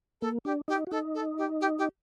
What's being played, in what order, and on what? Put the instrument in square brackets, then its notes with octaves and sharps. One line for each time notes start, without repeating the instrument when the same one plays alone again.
[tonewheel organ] A#3 [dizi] A4
[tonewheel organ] D4 [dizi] G4
[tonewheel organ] D#4 [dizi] G4
[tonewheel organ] F#4
[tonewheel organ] D#4 [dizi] A4
[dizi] A4
G4
G4
G4